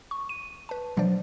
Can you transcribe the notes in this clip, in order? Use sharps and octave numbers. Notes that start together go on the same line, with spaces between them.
C#6
D#7
B4 A5
B2 F3 F#3 D4 C5 D5